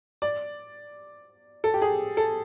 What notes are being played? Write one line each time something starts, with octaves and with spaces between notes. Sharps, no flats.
D5
A4
G4
G#4
A4